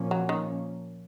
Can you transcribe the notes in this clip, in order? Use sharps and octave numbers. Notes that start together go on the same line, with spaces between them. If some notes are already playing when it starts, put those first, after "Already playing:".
Already playing: A#2 F3 A#3 C#4
F#3
D#3